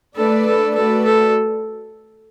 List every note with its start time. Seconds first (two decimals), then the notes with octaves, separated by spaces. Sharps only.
0.16 A3 D4 A4 B4 D5
0.46 A4
0.75 A3 F#4 A4 B4 D5
1.05 A4